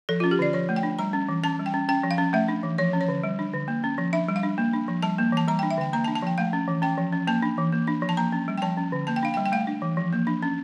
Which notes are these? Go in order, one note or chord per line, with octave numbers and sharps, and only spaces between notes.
F3 A4
F4
C#4
G4
D3 D5
F3 C#5
A3
G5
D4
G3 A#5
C#4
E3
C#4 A5
G3
G5
C#4
C#4 G5
F3
F5
C#4
A3 E5
D4
E3
F3 C#5
C#4
C#5
D3
G3
D4
D3
A#3
C#4
F3
D4 E5
G3
F5
D4
A#3
D4
F3
G3 A5
A#3
E3 A5
G3 A#5
G5
D4
E5
D3 G5
A#3 A#5
A5
D4
A5
F3 G5
A3 F5
C#4
E3
C#4 G5
F3
C#4
A#3 A5
D4
E3
A#3
D4
F3
A5
A#3 A#5
C#4
G3
G5
F3 A5
C#4
D3
A#3 A5
G5
D4 F5
G5
G3
G5
A3 F5
D4
E3
F3
A#3
D4
C#4